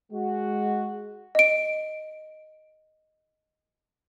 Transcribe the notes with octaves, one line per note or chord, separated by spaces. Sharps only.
G#3 F#4
D#5 D7